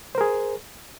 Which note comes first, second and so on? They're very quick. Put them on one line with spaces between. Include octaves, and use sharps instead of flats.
C5 A#4 G#4